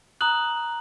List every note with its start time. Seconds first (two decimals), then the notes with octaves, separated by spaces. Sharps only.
0.21 A#5 D#6 F#6 F#7